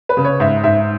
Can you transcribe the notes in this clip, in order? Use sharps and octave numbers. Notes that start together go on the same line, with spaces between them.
B4
C#3
C#5
G#2 E5
G#2 E5